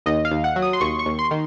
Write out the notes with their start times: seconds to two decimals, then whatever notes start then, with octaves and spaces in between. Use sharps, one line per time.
0.06 D#2 D#5
0.25 F5
0.31 D#2
0.44 F#5
0.56 F#3
0.62 D#6
0.73 C6
0.81 D#2 C#6
0.99 C#6
1.06 D#2
1.19 C6
1.31 D#3